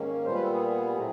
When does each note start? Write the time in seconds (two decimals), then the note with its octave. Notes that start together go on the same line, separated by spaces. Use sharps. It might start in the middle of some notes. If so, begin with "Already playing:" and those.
Already playing: G#2 D#3 A#3 C#4
0.26 A#2 G3 B3 C5
0.35 B4
0.44 A4
0.52 G#4
0.95 A2 F#3 A3 C4